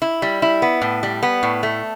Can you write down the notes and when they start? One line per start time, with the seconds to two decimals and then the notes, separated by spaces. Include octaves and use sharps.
0.02 E4
0.22 G3
0.42 E4
0.62 B3
0.82 A2
1.03 G3
1.23 B3
1.43 A2
1.63 A3